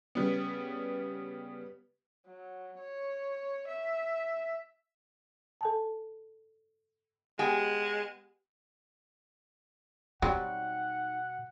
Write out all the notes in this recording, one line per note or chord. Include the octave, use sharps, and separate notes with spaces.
C#3 G3 B3
F#3
C#5
E5
A4 G#5 A5
G#3 B3 G4 G5 G#5
B2 F#3 G3 C4 D#4 F#5